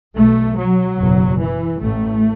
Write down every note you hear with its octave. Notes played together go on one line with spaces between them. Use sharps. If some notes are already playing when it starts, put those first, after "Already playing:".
B1 B2 A3
F#3
F#1 E2 B2
E3
A1 A2 A3